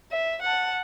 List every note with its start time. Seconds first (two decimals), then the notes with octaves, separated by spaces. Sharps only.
0.11 E5
0.42 F#5 A5